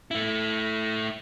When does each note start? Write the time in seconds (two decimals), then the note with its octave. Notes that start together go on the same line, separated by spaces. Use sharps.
0.11 A3 E4